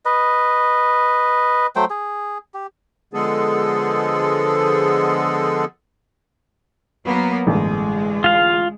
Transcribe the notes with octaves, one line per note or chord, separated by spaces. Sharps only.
B4 D#5
F#3 A3 C5 G5
G#4
G4
D3 F3 G#3 B3 G#4 A4
F#3 A#3 B3
A1 G2 D3 G#3
F4 F5